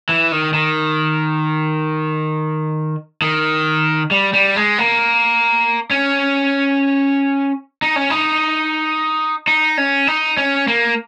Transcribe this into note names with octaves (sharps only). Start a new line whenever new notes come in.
E3
D#3
D#3
D#3
G3
G3
G#3
A#3
C#4
D#4
C#4
D#4
D#4
C#4
D#4
C#4
A#3